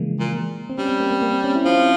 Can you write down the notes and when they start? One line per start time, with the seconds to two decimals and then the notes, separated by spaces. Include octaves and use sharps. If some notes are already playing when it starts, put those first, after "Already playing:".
Already playing: C#3 E3 F3 G#3 A#3
0.20 A#2
0.70 C4
0.78 G3 C#4
0.89 C4
1.00 A#3
1.11 A#3
1.22 A#3
1.33 C4
1.44 C#4
1.55 E4
1.65 F3 C4